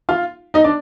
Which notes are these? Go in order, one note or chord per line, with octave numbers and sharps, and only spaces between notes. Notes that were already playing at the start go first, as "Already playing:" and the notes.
F4 F5
D#4 D#5
D4 D5